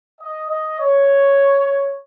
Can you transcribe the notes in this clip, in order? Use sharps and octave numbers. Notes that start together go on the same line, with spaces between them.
D#5
D#5
C#5